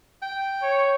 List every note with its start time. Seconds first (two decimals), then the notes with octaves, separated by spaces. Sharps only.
0.22 G5
0.63 C#5